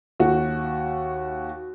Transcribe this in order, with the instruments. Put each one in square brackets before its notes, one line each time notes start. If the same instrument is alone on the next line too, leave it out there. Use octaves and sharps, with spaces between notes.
[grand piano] D#2 F#4